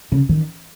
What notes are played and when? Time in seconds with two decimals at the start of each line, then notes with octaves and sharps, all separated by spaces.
0.12 C#3
0.29 D#3